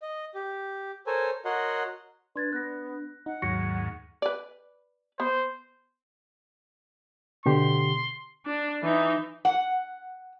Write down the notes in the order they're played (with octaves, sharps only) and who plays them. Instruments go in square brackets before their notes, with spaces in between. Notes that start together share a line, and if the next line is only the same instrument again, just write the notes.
[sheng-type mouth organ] D#5
G4
A4 A#4 C5 C#5 G#5
F#4 A#4 C#5 D#5 F#5 C6
[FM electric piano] D4 [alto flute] B4 [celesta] C6 G#6 A6
[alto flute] B3 [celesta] F#6 A#6
[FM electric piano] D#4 [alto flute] F#5
[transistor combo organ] D#2 G#2 [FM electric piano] F#3 [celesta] C#6 A#6 C#7
[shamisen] B4 D5
[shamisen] B3 [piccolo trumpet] C5
[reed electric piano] B2 D3 G4 [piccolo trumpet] C6
[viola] D4
E3 D#4
[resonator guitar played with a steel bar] F#5